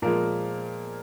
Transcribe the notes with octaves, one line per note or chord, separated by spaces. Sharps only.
A#2 F3 G#3 A#3 A#4